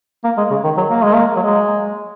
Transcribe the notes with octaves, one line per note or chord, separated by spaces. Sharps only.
A#3
G#3
C#3
D#3
F#3
A#3
G#3
A#3
F#3
G#3